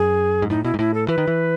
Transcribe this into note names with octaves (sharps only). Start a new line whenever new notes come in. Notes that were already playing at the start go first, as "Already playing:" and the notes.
Already playing: F#2 G#4
G#2
A2 D#4
B2 E4
G#2
A2 E4
A4
E3 B4
D#3
E3